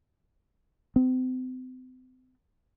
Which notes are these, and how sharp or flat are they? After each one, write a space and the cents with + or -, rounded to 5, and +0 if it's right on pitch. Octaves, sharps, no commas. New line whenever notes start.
C4 -40